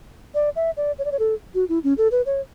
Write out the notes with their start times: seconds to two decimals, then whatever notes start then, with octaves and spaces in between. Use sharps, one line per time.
0.35 D5
0.56 E5
0.77 D5
0.99 C#5
1.05 D5
1.12 C#5
1.19 A4
1.55 F#4
1.69 E4
1.84 C#4
1.98 A4
2.12 B4
2.26 C#5